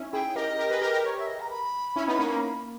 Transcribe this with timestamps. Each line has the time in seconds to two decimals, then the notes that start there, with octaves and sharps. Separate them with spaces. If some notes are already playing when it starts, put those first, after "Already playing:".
Already playing: C#4 D#4 E4
0.13 E4 G#4 G5
0.36 G4 A#4 D#5
0.59 G4 A#4
0.70 G#4 B4
0.81 G4 A#4
0.93 G4 A#4
1.05 C#5
1.19 E5
1.27 D#5
1.41 A#5
1.51 B5
1.96 C#4 E4
2.08 B3 D#4
2.19 A#3 C#4
2.30 A#3
2.35 A#5
2.41 B5